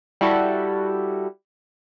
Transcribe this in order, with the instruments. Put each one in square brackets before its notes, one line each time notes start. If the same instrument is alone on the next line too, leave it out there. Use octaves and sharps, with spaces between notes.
[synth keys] G3 E4 F#4 A4